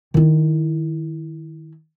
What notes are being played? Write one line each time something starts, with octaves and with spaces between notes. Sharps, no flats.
D#3 E4